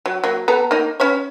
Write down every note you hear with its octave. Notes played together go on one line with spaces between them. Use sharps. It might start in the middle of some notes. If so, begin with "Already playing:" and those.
F#3
F#3 A#3
B3 A4 A#5
A#3 D#4
C#4 B4 C#5